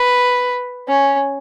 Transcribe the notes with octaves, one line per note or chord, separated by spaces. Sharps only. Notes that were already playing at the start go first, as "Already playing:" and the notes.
Already playing: B4
C#4